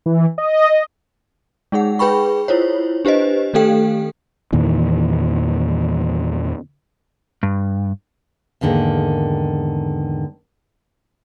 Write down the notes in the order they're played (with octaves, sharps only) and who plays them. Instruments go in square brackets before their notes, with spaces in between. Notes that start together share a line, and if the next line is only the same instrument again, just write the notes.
[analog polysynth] E3
D#5
[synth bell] G#3 D#4 G#4 F#5
G#4 B4 G5 B5 C#6
E4 F4 C5 C#5
D4 G4 B4 C5 D#5
D#3 A3 G4 A4 F5 G5
[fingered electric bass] E2 A#2 D#3 E3
[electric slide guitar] G2
[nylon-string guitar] E2 G#2 D3 D#3 A#3